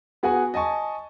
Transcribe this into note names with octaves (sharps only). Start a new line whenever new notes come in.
B3 F#4 G#4 F#5 G#5
D#5 G#5 A5 C#6